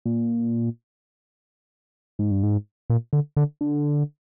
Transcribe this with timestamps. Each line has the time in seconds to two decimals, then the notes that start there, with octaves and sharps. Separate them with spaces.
0.05 A#2
2.19 G#2
2.31 G2
2.43 G#2
2.90 A#2
3.13 D3
3.37 D3
3.61 D3